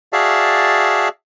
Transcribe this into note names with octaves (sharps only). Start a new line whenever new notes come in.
F#4 G#4 D5 E5 F5 A5